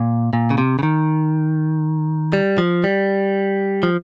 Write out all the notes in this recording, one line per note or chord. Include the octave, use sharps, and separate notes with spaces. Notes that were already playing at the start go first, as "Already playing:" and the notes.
Already playing: A#2
A#2
C#3
C3
C#3
D#3
G3
F3
G3
F3